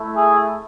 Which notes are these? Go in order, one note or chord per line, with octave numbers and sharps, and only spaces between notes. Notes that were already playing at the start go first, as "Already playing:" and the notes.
Already playing: A3 E4
G#4